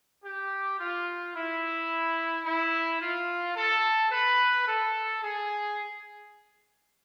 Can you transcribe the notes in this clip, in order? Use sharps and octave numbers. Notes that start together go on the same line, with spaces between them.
G4
F4
E4
E4
F4
A4
B4
A4
G#4